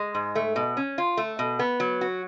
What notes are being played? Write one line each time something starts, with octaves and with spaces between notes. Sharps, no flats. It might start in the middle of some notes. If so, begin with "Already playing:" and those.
Already playing: G#3
G#2
A3
B2
C#4
F4
A3
B2
B3
F#3
F#4